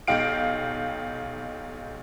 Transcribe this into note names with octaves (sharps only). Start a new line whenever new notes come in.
B1 D#4 G4 F5 D7